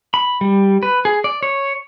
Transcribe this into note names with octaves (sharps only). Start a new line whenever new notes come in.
B5
G3
B4
G#4
D5
C#5